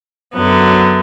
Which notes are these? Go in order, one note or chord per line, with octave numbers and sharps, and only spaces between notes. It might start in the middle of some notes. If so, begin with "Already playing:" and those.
F#2 D3 F#3 B3